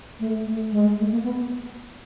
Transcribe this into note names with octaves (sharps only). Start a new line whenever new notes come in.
A3
A3
G#3
A3
A#3
B3